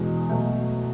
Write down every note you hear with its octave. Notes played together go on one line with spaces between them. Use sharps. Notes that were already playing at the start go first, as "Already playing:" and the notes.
Already playing: E2 B2 G#3
B2 F#3 A3